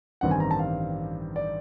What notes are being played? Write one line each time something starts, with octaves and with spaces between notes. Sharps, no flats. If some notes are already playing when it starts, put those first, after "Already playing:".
A1 G2 D#3 G3 C4 F#5
G#5
A#5
A5
F5
D5